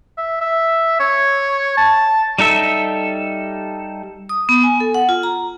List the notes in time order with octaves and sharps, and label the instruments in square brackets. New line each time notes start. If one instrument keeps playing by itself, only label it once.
[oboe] E5
E5
C#5
A5
[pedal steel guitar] G3 D#4 A4 E5
[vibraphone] D#6
B3
G#5
A4
F#5
F4
A#5